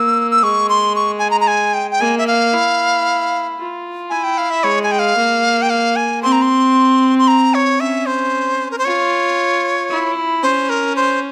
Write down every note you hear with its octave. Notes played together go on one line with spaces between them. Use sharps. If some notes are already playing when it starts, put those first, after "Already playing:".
Already playing: A#3 E6
E6
G#3 C#6
C6
C#6
G#5
A#5
A#5
G#5
G5
G5
A#3 G#5
E5
F5
E4
F4
E4 G#5
G5
F5
E5
G#3 C#5
G#5
G5
F5
A#3
G5
F5
G#5
C4 C6
A#5
C6
C6
A#5
C#5
C#4 E5
C5
A#4
C5
F4 C#5
E4
C#4 C5
A#4
C5